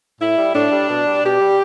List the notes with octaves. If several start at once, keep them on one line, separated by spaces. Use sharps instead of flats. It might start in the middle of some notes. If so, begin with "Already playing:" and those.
A2 E4
G3
A2 D4
G3
B2
G3
B2 G4
G3